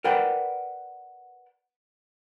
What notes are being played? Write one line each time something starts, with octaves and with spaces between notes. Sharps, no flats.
A#4 B4 D5 F#5 G5